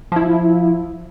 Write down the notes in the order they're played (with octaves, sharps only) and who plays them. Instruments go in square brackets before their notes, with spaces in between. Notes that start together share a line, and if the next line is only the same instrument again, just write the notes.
[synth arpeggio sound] F3 E4